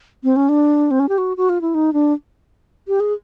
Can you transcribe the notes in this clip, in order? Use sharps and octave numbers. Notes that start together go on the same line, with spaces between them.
C4
C#4
D4
C4
C#4
G4
F#4
F#4
F4
E4
D#4
D4
G4
G#4